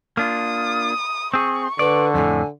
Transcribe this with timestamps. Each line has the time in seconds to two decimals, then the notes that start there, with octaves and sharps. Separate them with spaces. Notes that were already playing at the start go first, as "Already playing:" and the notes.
0.17 A#3 D4 F4 D#6
1.34 C4 G#4 C#6
1.79 D3 B4 D5
2.14 F2 A2 G#5